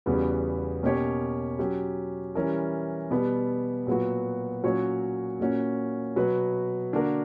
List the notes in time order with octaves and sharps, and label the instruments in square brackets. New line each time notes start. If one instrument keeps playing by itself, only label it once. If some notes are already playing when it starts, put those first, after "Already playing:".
[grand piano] E2 C#3 G3 B3 F#4
B2 A#3 C#4 G4 C#5
F#3 C#4 G4
E3 G3 C#4 E4 A#4
B2 G3 B3
A#2 F#3 B3 F#4
A#2 F#3 C#4 F#4 C#5
A#2 A#3 C#4 F#4
B2 F#3 B3 F#4 B4
D3 A#3 D4 F#4 A#4